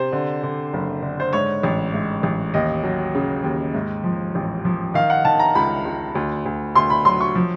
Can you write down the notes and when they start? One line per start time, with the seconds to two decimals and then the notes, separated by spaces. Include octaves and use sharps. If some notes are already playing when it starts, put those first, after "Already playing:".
Already playing: C3 C5
0.12 D3
0.43 D3
0.73 F#1
1.02 D3
1.20 C5
1.33 G#2 C#5
1.63 A1
1.94 G#2
2.23 A1
2.54 D#2 D#5
2.83 F#3
3.15 C#3
3.44 D#2
3.74 G#2
4.04 F3
4.35 A1
4.65 F3
4.94 D#3 F5
5.10 F#5
5.25 D#3 A5
5.40 A#5
5.55 C#2 B5
5.85 C#2
6.15 D2
6.45 D2
6.75 D2 C6
6.90 B5
7.05 F#3 C6
7.21 C#6
7.35 F3